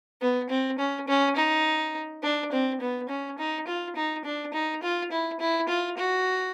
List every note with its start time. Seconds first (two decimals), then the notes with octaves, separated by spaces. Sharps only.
0.21 B3
0.50 C4
0.79 C#4
1.08 C#4
1.36 D#4
2.23 D4
2.52 C4
2.81 B3
3.09 C#4
3.38 D#4
3.67 F4
3.96 D#4
4.25 D4
4.54 D#4
4.83 F4
5.11 E4
5.40 E4
5.69 F4
5.97 F#4